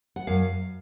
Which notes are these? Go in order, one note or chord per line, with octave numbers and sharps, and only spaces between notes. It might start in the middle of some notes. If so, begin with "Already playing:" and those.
F#5
F#2 F5